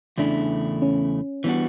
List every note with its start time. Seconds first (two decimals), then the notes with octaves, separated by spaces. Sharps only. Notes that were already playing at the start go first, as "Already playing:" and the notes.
0.18 E2 C#3 A3 D4 E4
0.82 C#4
1.44 E3 G3 B3 D4 F#4